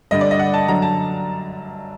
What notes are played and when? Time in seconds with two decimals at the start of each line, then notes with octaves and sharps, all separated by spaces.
0.11 G2 D3 G3 D#5
0.21 D5
0.31 D#5
0.39 F#5
0.54 A5
0.68 F#2 D3 F#3 A#5
0.82 A5